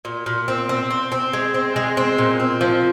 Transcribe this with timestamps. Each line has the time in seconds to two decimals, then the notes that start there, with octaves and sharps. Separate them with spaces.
0.05 A#2
0.26 A#2
0.48 C4
0.69 C4
0.90 C4
1.12 C4
1.33 G#3
1.54 C4
1.76 G#3
1.97 C4
2.18 A#2
2.40 C4
2.61 F3